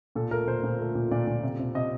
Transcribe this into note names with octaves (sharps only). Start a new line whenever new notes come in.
A#2 A4
A3 A#4
A#2 C5
A#2
A3
A#2
A#2 D5
A#2
C3
C3
C3 D#5